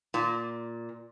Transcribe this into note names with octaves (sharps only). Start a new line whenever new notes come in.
A#2